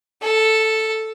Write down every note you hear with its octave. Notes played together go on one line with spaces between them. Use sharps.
A4